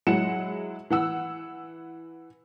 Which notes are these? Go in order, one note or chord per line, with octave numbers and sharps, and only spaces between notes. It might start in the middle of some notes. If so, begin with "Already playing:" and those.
F#3 G#3 E4 F#5 C#7 E7
E3 F#5 E6